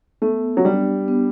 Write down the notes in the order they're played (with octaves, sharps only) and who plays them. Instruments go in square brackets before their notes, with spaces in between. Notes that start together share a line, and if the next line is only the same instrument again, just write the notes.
[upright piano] A3 [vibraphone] B3
[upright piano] F#3
[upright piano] G3 [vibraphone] D4 G4
[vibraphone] B3